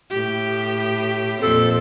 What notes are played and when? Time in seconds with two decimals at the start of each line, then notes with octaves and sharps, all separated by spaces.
0.10 A2 G4
1.41 F2 A#2 C4 A4